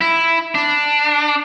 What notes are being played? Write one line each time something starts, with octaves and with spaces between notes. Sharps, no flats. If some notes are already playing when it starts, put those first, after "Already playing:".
E4
D4